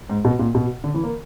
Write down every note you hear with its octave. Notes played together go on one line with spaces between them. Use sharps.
G#2
B2
A#2
B2
D3
E3
A#3